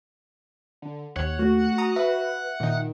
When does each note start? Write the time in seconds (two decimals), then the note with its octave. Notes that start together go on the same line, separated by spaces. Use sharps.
0.82 D3
1.16 D#2 C#5 F#5
1.39 A3 F#4
1.78 A#5 D#6
1.96 B4 E5
2.60 A#2 D#3 D#4